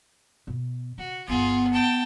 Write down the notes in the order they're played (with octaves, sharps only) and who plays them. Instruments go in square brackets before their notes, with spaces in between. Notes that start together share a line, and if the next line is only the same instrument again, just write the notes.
[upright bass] B2
[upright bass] C#3 [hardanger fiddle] F#4
[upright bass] G1 D2 [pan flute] B3 [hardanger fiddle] F4 G#4
[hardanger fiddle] G5 A5